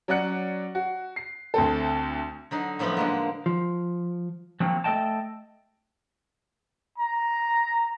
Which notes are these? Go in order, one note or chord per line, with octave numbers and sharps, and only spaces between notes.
F#3 C#4 D5 F#5 F#6 C#7
F#4
C7
D2 C4 A4
D3 F#3 D#4
F#2 A2 F3 B3 F4 B5
D3 G#3 A#3
F3
F3 F#3 A#3 C4
A3 A4 A#4 D#5 G5 A5
A#5